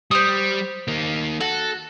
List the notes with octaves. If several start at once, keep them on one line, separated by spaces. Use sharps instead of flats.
G3 C5 D#6
D#3 A#3
F#4 A4